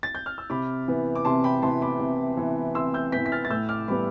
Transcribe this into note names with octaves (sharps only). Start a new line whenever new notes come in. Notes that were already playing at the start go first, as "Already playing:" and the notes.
A6
G6
F6
E6
C3 B5 D6
E3 B3
D6
C3 A5 C6
G5 B5
E3 B3 A5 C6
B5 D6
C3
E3 B3
C3 C6 E6
E6 G6
E3 B3 G6 B6
B6
F6 A6
A6
A2 E6 G6
D6 F6
E3 G3 B3 B5 D6